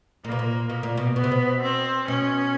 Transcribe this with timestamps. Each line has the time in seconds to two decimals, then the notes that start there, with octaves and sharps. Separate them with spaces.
0.24 A#2 A#3
0.32 B2
0.39 A#2
0.69 B2 A#3
0.83 A#2
0.97 B2
1.16 B2 B3
1.24 C3
1.32 B2
1.62 C4
2.07 B2 C#4